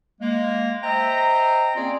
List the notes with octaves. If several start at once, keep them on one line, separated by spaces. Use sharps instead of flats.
G#3 A#3
C5 D#5 E5 G5 A#5
A#3 C4 C#4 F4 G#4 D5